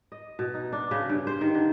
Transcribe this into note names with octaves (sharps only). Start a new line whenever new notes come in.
D#5
B2
D#4
D4
C#3
G2
C5
D#3
D3